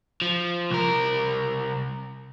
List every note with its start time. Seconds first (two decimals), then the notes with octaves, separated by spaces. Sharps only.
0.22 F3
0.70 C2 A#4